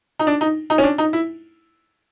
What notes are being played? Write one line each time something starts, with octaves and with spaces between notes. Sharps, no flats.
D#4
D4
D#4
D#4
C#4
D4
D#4
E4